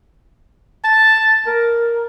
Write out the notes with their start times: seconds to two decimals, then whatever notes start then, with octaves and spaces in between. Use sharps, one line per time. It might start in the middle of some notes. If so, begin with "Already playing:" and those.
0.85 A5
1.47 A#4